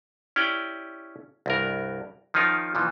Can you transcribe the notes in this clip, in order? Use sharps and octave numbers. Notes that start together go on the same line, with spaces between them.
C#4 E4 G4 D5 G5
C2 G2 A#4
D#3 F3 C#4 D#4 F4 A#4
A#2 E3 F3